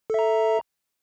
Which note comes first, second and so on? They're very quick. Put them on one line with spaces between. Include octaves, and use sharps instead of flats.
A4 E5 A#5